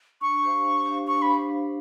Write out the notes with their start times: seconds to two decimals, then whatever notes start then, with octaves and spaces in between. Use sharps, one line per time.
0.21 D4 C#6
0.43 G4 C5 F5
0.65 D4
0.86 G4 C5 F5
1.07 D4 C#6
1.22 B5
1.29 G4 C5 F5